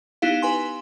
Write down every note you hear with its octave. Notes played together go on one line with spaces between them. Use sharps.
B3 D#4 E4 G4 F5
B4 G#5 C6